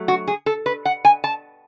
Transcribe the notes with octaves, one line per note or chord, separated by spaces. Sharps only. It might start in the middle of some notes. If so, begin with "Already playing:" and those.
Already playing: F#3 A3
F#4
G#4
A4
B4
F#5
G#5
A5